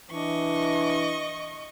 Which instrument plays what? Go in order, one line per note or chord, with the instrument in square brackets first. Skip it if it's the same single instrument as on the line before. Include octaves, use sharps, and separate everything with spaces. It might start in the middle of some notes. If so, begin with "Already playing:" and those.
[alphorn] E3 [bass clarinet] D4 [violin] D#5 C#6